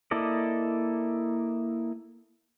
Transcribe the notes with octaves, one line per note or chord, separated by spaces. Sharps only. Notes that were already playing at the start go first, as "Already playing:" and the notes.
A#3 E4 A4 D5 D#5